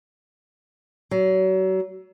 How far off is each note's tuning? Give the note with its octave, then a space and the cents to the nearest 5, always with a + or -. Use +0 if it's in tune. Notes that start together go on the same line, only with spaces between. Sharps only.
F#3 +35